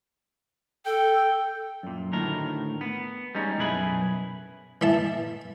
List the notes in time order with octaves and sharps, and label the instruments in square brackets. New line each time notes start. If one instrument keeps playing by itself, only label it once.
[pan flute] A4 [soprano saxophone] G5
[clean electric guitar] F#2 A#2
D2 A2 D#3 A#4
B3
G3 G#3 C#4 D#4
B1 F#2 E4 G#4 B4 B5
[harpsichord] E3 E5 A5